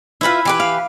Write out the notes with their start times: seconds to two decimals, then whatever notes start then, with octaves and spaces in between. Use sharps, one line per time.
0.21 E4 F4 B4 E5 B5
0.45 E3 G4 B4
0.60 F5